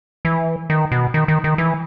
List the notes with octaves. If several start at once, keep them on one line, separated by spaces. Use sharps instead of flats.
E3
D#3
B2
D#3
D#3
D#3
E3